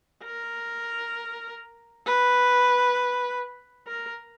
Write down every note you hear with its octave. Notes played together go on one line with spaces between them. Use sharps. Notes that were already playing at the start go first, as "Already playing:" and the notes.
A#4
B4
A#4